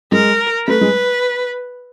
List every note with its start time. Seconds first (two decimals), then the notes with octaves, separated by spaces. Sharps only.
0.12 G#3 A#4
0.68 A3 B4
0.81 G#3